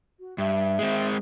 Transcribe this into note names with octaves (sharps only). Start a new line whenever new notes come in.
F#4
G2 E5
G#3 C4